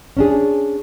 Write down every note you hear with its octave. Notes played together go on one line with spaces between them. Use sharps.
C#4 D4 G#4